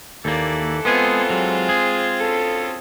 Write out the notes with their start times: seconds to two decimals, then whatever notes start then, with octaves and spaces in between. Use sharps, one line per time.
0.25 D#2 E3 A#3 A4 D5
0.85 G#3 B3 C4 F4 G#4
1.30 F#3 G#3
1.69 G#4
2.20 D2 C#3 A4